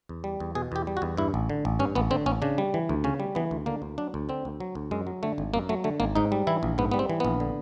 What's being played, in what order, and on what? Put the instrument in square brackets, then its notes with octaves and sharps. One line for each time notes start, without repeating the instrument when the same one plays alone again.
[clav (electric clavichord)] E2
G3
E2
B2 G#4
E2 G4
G3
F#4
E2
G2 E4
A1
D3
A1
G2 C#4
A1 B3
D3 C4
A1 C#4
C#3 D4
G3
E3
D2
C#3 C#4
G3
E3 B3
D2
D3 A#3
D2
F#3 D4
D2
D3 C4
D2
F#3
D2
F#2 G#3
F#3
D3 A3
G#1
F#2 A#3
F#3 A3
D3 A3
G#1 A#3
G#2 D#4
G3
E3 E4
A#1
G#2 B3
G3 B3
C4
E3
A#1 B3
D3